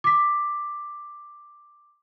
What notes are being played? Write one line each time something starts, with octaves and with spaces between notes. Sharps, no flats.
D6 B6